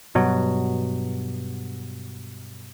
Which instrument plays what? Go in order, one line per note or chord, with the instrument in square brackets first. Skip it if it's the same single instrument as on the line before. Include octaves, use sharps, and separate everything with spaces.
[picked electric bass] G2 B2 F#3